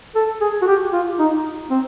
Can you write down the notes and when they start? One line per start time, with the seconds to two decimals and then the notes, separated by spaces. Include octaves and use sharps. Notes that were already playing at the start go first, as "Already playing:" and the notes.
0.15 A4
0.41 G#4
0.62 F#4
0.67 G4
0.93 F4
1.19 D#4
1.71 C4